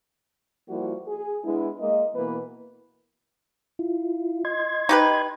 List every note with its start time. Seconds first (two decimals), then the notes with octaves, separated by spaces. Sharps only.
0.69 F3 G3 A#3 E4 F#4
1.08 G#4
1.45 G#3 B3 D4 E4
1.81 G#3 A#3 A#4 D#5
2.16 B2 E3 A#3 B3 B4
3.79 E4 F4
4.45 D#5 C6 G#6
4.89 D#4 G4 B4